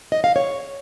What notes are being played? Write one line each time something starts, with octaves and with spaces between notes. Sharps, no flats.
D#5
F5
C#5